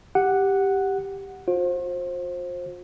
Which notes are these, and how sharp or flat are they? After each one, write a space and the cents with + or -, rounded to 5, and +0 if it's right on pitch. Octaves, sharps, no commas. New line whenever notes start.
G4 +0 F#5 +0
F4 +45 C5 +20